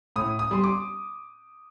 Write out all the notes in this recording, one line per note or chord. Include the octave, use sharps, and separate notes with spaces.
A2 D#6
D#6
G3 C6
D6